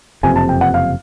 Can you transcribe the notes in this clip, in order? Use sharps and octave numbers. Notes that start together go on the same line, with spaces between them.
F#1 F2 C3 G#5
A5
G5
F#5
F5